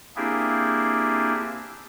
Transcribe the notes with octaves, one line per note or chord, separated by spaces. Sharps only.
A#3 C4 D4 E4 G4 G#4